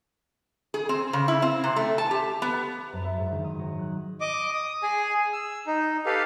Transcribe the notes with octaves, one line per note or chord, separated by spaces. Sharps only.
G#4
C4
C#3
E4
C4
C3
A3
A5
G4
B3
F#2
E5
G#2
D#3
D#6
F#3
F#6
D#5 D6
D#6
G#4 G#5
E6
D#4
G4 A4 B4 F5